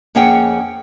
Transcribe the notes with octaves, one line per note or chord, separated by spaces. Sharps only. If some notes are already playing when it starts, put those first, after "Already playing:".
F2 A#3 C#4 G#4 F#5 G5